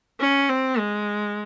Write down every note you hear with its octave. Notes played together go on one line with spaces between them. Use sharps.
C#4
C4
G#3